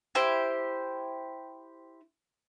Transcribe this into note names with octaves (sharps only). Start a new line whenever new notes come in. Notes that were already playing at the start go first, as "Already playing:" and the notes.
E4 G4 C5